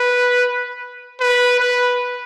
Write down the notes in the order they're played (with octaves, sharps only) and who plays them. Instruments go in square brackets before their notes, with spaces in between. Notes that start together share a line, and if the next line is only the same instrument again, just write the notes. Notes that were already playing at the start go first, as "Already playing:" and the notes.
Already playing: [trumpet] B4
B4
B4